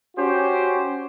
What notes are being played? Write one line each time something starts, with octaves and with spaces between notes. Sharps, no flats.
C#4 F#4 G4 C5